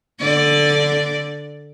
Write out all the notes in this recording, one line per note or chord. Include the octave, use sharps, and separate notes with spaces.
D3 D5